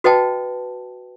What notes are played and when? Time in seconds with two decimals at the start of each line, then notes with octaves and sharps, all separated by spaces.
0.04 F#4 B4 D#5 G5 A5